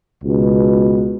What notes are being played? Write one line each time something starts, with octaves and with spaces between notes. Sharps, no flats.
C#2 B2